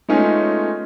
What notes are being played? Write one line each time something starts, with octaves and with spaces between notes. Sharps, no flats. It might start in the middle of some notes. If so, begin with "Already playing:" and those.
G#3 A3 B3 C#4 D#4 F4